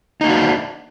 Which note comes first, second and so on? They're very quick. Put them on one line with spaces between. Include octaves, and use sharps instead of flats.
D#4 A#3 F#4 D4